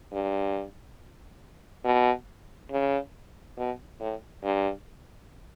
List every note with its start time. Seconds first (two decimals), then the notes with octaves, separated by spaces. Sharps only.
0.12 G2
1.85 B2
2.71 C#3
3.58 B2
4.00 A2
4.44 G2